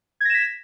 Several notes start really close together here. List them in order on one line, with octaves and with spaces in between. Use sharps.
G#6 A#6 E7 B6